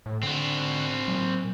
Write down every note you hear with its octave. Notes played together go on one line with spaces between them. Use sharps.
A2
D3 C4 F#4
A#2 F#3